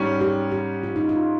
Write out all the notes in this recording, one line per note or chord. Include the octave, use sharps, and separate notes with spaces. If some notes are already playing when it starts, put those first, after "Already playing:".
Already playing: G#2 G3 C#4
G4
G4
F4
D#4
F4